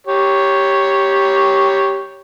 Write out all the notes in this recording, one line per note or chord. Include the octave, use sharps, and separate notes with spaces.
G4 C#5